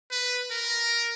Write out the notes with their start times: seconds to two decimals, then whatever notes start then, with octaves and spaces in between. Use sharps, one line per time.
0.11 B4
0.51 A#4